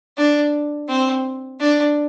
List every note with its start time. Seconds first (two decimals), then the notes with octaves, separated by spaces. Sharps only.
0.17 D4
0.88 C4
1.60 D4